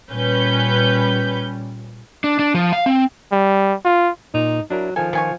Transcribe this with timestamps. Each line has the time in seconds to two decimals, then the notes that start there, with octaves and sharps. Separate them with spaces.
0.10 A#2 G3 C#4 B4 G6
2.24 D4
2.39 D4
2.54 F3
2.73 F5
2.86 C4
3.32 G3
3.85 F4
4.34 A#2 D#4
4.70 F#3 D4 E4 A#4
4.96 D#3 F3 A4 G#5
5.13 B2 D#3 F4 G#5 C#6